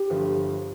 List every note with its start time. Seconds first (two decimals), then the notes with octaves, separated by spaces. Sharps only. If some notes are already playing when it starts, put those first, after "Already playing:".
Already playing: G4
0.10 G1 G2 F3 A3